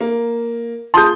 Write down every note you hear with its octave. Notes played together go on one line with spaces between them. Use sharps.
A#3
F4 G#4 A5 C6 D#6 G6